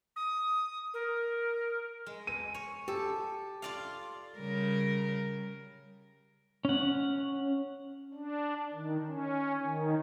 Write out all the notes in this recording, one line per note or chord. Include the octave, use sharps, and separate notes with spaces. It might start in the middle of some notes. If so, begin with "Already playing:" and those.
D#6
A#4
G#3
D#7
C#5
G4 A4
F4 D5 F5
C#3 G3 A#4
C#4 F#5
D4
D#3
C#4
D#3